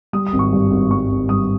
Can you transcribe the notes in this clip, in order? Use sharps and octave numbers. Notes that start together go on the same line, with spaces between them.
G3 D#6
D#6
G#1
C#6
G2
G#1
G3 C#6
G#1
G2 D#6